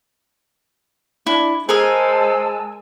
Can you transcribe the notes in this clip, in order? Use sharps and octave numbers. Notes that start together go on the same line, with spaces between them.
D4 E4
G#3 G#4 A#4 C5 D#5 G#5 A5 E6